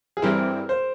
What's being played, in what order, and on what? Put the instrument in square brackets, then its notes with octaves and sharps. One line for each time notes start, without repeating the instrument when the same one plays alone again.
[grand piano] G#4
[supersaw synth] G2 E3 G3 C4 E4 [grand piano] A#4
[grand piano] C5